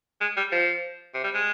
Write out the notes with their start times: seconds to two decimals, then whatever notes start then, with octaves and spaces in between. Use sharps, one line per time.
0.21 G#3
0.37 G3
0.52 F3
1.14 C3
1.24 G3
1.34 G#3